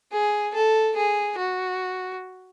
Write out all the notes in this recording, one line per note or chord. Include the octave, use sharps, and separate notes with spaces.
G#4
A4
G#4
F#4